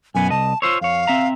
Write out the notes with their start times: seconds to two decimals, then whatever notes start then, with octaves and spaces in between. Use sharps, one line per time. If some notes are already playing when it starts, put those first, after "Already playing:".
0.15 B1 F#2 B3 G#5
0.30 C2 D#5 A5
0.62 F4 C5 C#5 E6
0.81 F2 C#5 F5
1.07 C4 E5 A#5